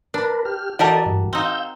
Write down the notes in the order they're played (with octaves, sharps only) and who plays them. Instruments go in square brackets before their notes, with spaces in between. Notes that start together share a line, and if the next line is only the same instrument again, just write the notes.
[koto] D4 [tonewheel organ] A#4 B4
[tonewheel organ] G4 F6
[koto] E3 G4 A#4 [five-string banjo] F#4 A5 [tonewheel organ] A4 D5 D#5
[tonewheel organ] G2
[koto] C4 D#4 [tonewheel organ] F5 E6 G6